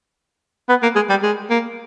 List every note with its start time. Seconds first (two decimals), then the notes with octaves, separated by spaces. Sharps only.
0.69 B3
0.83 A#3
0.95 G#3
1.09 G3
1.23 G#3
1.50 A#3